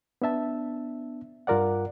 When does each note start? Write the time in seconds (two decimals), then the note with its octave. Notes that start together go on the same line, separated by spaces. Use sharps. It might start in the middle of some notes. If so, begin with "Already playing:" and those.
0.22 B3 D4 E5 A5
1.47 G2 F4 A#4 D5 F#5